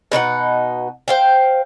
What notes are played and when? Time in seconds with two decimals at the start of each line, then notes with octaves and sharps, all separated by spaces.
0.12 B2 D#4 A#4 F#5
1.08 C5 F5 G5